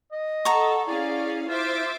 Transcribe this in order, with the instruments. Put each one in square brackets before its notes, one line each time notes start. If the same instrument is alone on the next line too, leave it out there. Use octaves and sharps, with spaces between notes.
[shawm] D#5
[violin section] A4 [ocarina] F#5 [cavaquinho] A#5 C#6
[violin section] C#4 G#4 F5 [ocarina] E4 [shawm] D5
[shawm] F4 [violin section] C5 E5 D6